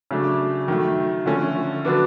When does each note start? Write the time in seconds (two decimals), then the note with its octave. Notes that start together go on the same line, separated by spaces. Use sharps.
0.11 C#3 F#3 A3 D4
0.68 D#3 F#3 A3
1.26 D3 F3 A3 C#4
1.85 D3 F#3 B3 D4